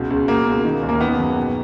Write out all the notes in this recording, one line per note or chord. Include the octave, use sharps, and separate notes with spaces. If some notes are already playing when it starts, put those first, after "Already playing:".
Already playing: C#2 B2
C#2
B2 A#3
C#2
D#3
D#2
A#3
D#3 B3
F#2
B2